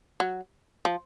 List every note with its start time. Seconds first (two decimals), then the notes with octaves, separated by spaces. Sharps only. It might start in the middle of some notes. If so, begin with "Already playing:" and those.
0.20 F#3
0.85 F3